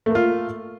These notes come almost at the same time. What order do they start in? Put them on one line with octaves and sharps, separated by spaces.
A3 A#3 F4